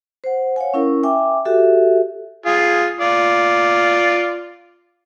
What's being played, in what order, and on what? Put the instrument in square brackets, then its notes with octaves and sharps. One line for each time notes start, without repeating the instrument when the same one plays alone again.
[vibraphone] C5 F#5
C#5 F5 F#5 G#5
C#4 E4 A#4
E5 G5 G#5 D6
F#4 G4 A4 E5
[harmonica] F4 G#4
F4 D5